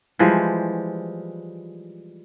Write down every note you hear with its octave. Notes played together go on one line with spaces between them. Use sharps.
E3 F3 G3 G#3